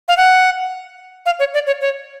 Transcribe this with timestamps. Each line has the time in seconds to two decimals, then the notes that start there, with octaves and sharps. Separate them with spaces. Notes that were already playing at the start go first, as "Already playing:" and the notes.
0.08 F5
0.17 F#5
1.26 F5
1.39 C#5
1.54 D5
1.67 C#5
1.81 C#5